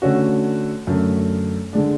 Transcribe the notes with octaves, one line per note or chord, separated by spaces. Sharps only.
D3 A3 C#4 F#4
F#2 D3 A3
D3 G#3 D4